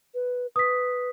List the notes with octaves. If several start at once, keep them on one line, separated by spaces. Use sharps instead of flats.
B4
B4 D#6 B6